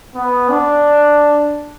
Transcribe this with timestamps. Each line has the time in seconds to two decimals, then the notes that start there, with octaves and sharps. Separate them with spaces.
0.15 B3
0.49 D4